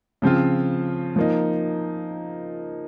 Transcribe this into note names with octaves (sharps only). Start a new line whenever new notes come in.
C#3 F3 C4 F4
F3 A#3 D#4